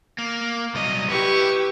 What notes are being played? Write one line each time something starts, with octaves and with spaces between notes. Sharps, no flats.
A#3
C2 F#3 D#5
E4 G4 B4 C#6